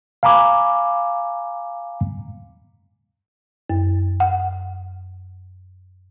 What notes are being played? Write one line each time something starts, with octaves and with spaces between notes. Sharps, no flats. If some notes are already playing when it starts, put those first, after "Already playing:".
F5 G#5 A#5 B5 D6
F#2
F#5